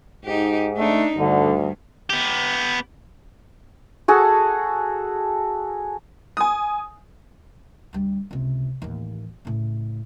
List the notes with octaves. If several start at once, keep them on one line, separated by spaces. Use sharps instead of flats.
G#2 D#4 G4
A3 D4 D#4
D2 G2 D3
B3 G4
F#4 G#4 A4 A5
G#5 D#6
D2 G3
C#2 C3
A1 D#2
A2 C#3